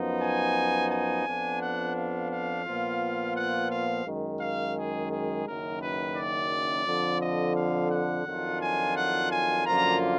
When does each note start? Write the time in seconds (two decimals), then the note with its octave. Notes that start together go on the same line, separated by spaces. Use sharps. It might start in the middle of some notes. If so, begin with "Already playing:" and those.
Already playing: F#2 F3 B3 D#4
0.21 G#5
0.91 G#5
1.25 F2 F3 B3 D4
1.61 F#5
1.96 F5
2.30 F5
2.66 A#2 F3 B3 F4
3.36 F#5
3.70 F5
4.06 F#2 D#3 G#3
4.40 F5
4.75 G#4
5.11 G#4
5.46 F#1 F#2 D#3 A#4
5.80 B4
6.16 D5
6.86 F2 D3 F3
7.21 D#5
7.56 F5
7.91 F#5
8.26 F2 D#3 F#3 D4 F4
8.61 G#5
8.95 F#5
9.30 G#5
9.65 F#2 D3 F3 A#3 F4 A#5